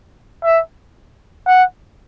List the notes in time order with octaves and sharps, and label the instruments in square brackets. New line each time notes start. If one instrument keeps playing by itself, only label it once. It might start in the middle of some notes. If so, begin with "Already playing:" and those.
[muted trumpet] E5
F#5